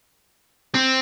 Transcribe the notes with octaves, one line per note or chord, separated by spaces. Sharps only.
C4